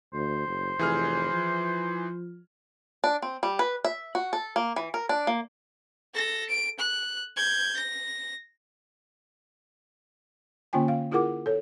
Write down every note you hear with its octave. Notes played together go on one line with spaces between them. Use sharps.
D2 C5
F#1
F1 E3 G#4 F6
F3
D4
C4
G3
B4
E5
F#4
A4
A#3
E3
A#4
D4
A#3
A4 A#6
D7
F#6
G6 G#6
A#6
D3 A#3 C#4 F4 G5 G#5
F5
E4 F4 G#4 A#4 F#5 D6
A4 C#5